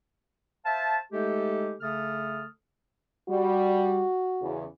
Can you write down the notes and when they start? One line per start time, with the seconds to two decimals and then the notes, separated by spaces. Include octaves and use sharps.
0.64 C5 E5 F5 A5
1.12 G#3 A3 D#4 G4 A4
1.80 C#3 A3 A4 D#6 F6
3.29 G3 F#4
4.41 E2 C#3